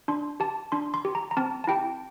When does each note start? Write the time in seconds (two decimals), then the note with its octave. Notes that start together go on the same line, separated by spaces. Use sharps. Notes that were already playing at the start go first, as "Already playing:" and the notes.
0.08 D4 C6
0.40 G4 A5
0.72 D4 C6
0.94 C6
1.05 G4
1.15 A#5
1.31 A#5
1.37 C4 A5
1.64 A5
1.68 E4 G4 G5